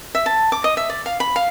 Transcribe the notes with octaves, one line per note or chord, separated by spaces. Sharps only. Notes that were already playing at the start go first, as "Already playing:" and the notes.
E5
A5
D6
D#5
E5
D5
F5
B5
F5